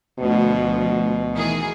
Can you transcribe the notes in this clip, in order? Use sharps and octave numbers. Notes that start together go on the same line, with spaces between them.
D2 B2 F3
D#3 E3 G#4